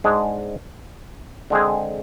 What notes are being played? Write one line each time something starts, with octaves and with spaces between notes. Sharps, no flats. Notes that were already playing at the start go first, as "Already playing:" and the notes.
G#2 G#3 D4 G#4
D3 G#3 C4 G#4